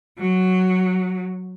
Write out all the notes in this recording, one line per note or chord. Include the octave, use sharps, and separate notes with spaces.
F#3